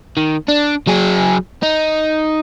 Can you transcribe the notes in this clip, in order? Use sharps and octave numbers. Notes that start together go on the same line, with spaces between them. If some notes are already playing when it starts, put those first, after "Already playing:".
D#3
D4
F#3 G#4
D#4